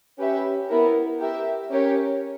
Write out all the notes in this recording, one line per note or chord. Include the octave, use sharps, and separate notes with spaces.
C#4 G4 B4 E5
B3 E4 A#4
G4 A#4 E5
C#4 G4 A#4 C#5